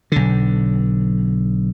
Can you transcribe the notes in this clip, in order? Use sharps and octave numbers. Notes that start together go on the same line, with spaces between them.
B1 D3